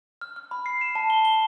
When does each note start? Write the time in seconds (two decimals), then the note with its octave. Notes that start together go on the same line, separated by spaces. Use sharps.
0.21 F6
0.36 F6
0.51 B5
0.66 C7
0.81 E7
0.95 A5
1.10 G7
1.25 G7